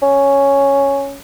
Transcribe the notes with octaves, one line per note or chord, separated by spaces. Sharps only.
C#4